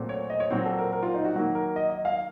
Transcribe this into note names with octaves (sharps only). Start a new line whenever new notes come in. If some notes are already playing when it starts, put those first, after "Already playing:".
Already playing: A#2 F#3 A3 C4
C#5
D#5
C#5
A#2 F#3 C4 C5
A4
A#4
A#4
F4
D#4
F#4
D#3 F#3 A#3
A#4
D#5
D#5
F5